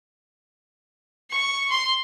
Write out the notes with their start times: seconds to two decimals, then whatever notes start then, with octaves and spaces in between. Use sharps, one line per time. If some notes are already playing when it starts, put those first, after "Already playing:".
1.30 C#6
1.71 C6